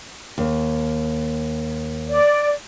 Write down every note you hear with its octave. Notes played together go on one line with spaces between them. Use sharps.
D#2
D5